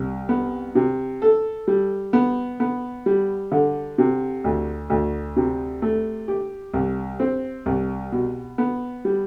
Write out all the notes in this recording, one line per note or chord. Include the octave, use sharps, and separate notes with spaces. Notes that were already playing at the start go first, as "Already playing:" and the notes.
Already playing: C2
B3
C3
A4
G3
B3
B3
G3
D3
C3
D2
D2
C3
A3
G4
C2
C4
C2
B2
B3
G3